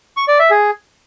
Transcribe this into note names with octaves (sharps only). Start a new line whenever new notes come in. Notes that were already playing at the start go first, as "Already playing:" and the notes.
C#6
D5
E5
G#4